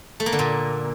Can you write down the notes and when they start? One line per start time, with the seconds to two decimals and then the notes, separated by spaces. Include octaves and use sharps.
0.20 A3
0.26 A#3
0.32 D3
0.39 A#2